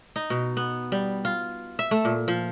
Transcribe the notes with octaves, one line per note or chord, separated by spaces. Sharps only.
D#4
B2
B3
G3
F4
E5
A3
A#2
F3